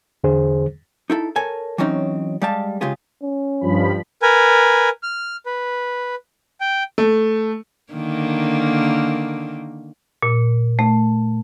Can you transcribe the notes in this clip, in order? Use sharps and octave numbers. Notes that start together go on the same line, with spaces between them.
E2 D3 G#4 C5
D#4 E4 A4
A4 A#4 C#5 G#5
E3 F#3 C4 C#4 D#4
G3 G#3 G4 F5 A5
C#3 G#3 F4 G4 G#4
C#4
G2 F3 B5
A#4 B4 G#5
F6
B4
G5
A3
D3 D#3 A#3
A#2
A3